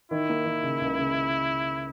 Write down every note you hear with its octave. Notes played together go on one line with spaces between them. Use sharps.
D#3 E4
A#3
D#3
C#3
C#2
C#3